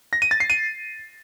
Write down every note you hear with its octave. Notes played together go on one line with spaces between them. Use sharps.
A#6
D#7
A6
C7
D#7